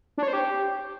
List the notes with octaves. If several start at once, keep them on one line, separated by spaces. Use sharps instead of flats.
D4
C#5
C5
G4